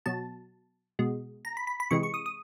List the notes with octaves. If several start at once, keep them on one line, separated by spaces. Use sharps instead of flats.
B2 F#3 A5
B2 G#3
A#5
B5
B5
B5
C3 E3 G#3 C#6
C#6
D#6
D#6